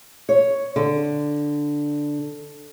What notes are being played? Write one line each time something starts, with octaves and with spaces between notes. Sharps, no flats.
C#5
D3